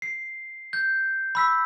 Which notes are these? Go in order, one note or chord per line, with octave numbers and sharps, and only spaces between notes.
C7
G6
B5 E6 B6